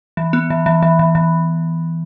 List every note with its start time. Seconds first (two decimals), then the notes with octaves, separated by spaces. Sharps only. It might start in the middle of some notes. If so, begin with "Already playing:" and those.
0.17 E3
0.33 B3
0.50 E3
0.66 E3
0.82 E3
0.99 E3
1.15 E3